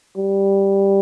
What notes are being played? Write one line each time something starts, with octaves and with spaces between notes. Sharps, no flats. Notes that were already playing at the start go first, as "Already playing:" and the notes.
G3